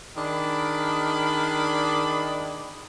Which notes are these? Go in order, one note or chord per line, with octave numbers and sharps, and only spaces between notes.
D#3 D4 G#4 D5 B5